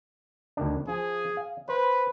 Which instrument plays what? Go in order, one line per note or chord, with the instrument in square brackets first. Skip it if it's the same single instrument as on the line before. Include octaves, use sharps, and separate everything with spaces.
[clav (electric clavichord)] D2 D#3 D4
[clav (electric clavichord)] F3 [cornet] G#4
[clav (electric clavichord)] F5
[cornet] B4 [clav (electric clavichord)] C5